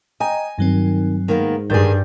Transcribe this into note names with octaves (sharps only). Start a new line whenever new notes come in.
D#5 G5 G#5 A#5
G2 D#3 F#3 C4
G#2 D#3 A#3 B3
G2 D#3 G#4 G6 A6